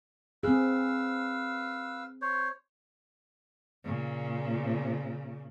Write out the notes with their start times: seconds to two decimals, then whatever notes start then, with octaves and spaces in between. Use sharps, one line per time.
0.43 C4 G#4 B4 F5 E6
2.22 C5 C#5
3.84 A#2 C#3